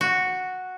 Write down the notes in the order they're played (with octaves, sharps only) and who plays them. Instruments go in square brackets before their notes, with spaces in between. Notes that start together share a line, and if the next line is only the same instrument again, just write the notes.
[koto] F#4